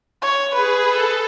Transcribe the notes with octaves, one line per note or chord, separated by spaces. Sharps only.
C#5
G#4 B4
A4